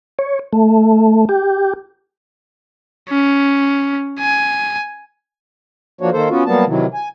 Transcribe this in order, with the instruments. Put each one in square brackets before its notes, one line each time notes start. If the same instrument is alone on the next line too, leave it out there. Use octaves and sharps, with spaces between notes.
[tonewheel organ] C#5
A3
G4
[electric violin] C#4
G#5
[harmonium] F3 A#3 D4 F#4 C#5
D#3 A#3 A4 C5
B3 C#4 F4 F#4
F#3 G3 A#3 B3 A5
C3 D#3 E3 F#3
G#5